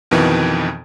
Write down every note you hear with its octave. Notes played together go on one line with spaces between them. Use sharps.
F2 B2 D#3 E3